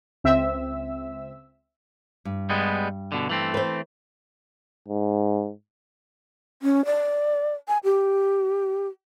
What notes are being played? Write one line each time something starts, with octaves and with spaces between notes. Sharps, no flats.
C#2 C4 E5 E6
G2
G3 G#3 B3
B2 D3
E3 A3 C4
B4 C5
G#2
C#4
D5
G#5
G4